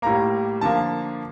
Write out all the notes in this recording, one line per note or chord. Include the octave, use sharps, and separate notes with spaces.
A2 G3 A#3 A#5
D3 F3 A#3 A5